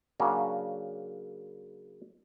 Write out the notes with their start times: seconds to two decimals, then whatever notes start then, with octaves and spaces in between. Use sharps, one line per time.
0.20 C#3 F#3 A#3 D4